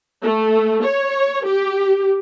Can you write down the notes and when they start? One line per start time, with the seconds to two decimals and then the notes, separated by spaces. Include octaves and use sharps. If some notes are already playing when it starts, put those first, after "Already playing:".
0.22 A3
0.83 C#5
1.45 G4